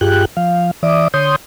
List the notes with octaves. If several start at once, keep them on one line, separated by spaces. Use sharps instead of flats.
G2 F4 G4 G#4 G5 F#6
F3 F5
E3 D5 E5 D6 D#6
D3 C#5 C6 D#6 G6